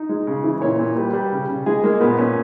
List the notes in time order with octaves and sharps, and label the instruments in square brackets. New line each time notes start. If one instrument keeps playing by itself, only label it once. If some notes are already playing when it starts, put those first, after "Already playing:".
Already playing: [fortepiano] D#4
G#3
C#3
E3
A#2 C#5
A#2
G3 B4
G3
C#3
C#3
G#3 G#4
G#3 A#3
A#2 B3
A#2 C#4